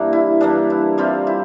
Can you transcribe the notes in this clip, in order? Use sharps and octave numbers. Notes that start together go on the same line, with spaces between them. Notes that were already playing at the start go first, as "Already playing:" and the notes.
Already playing: G2 E3 A#3
E4
G2 E3 A#3 D4
E4
C3 G3 C4 F4
E4